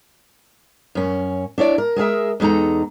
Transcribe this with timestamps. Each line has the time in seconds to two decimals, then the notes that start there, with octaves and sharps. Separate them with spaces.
0.95 F#2 C#4
1.58 D4 E4 C#5 D5
1.78 A#4
1.96 G#3 G#4 A#4 E5
2.40 E2 G#3 D#4 A4 A#5